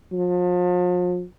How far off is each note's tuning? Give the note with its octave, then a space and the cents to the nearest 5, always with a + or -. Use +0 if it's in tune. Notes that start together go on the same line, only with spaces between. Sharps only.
F3 +40